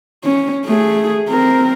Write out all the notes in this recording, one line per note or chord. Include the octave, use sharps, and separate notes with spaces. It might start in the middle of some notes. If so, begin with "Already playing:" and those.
C#4
A3 G#4
C4 A#4